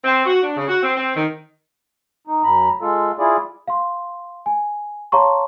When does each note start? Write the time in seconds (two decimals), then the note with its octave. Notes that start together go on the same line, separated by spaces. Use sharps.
0.04 C4
0.26 F#4
0.43 D4
0.56 C#3
0.68 F#4
0.82 C4
0.96 C4
1.16 D#3
2.27 D#4
2.43 F#2 A#5 B5
2.82 G#3 F4 A4
3.19 E4 F4 G#4 D5
3.68 F5 C6
4.46 G#5
5.12 C#5 F5 A5 A#5 C6 C#6